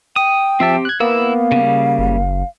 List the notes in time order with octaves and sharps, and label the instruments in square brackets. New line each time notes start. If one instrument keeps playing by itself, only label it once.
[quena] G5 [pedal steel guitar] D#6
[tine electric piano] F3 E5 A5 [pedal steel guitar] C4 G4
[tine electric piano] F#6 G#6
[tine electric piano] A#3 [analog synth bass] B3 [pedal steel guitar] E4 E6 [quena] F5
[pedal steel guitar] C#3 G3
[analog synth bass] F#1